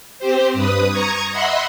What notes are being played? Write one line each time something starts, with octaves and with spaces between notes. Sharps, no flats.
C4 G4 C5
G2 B4 D#6
A#5 C#6 D#6 G#6
D#5 E5 F#5 B5 C6